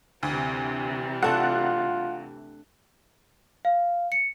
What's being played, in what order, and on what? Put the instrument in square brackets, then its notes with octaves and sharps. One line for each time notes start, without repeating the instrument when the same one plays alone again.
[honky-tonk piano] D2 [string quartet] C3 E3 G3
[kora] A3 D4 A4 [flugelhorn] F4 [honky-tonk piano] F#5
[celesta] F5
C#7